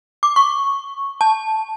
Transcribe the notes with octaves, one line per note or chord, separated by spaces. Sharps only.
D6
C#6
A5